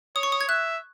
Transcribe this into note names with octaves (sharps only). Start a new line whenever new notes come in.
C#5 D#6
C#6
D#6
G#6
E5 F#6